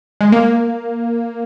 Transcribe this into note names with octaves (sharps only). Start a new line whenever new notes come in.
G#3
A#3